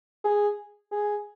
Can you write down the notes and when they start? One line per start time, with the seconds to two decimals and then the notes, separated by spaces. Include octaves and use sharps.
0.24 G#4
0.92 G#4